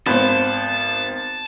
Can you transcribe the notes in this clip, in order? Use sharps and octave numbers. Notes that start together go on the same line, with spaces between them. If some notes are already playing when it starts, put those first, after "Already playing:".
G#1 B3 C5 A5